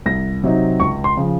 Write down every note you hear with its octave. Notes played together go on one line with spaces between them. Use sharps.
C2 A#6
C3 F#3 C4 D#4
C#2 C#6
C6
C#3 F3